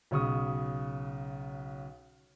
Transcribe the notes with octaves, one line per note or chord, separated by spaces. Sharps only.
B1 C#3 C#6 D#6